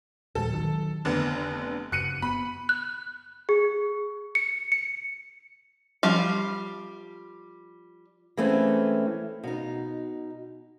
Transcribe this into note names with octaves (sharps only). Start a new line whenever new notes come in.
D#1 A#1 G#3 A4
D#3 F#3
F1 D3 B3
F#1 F#6 C#7 D#7
B3 B5
F#6
G#4
C#7
C#7
F3 G3 F5
E3 G#3 A3 C4 C#4
B2 D#4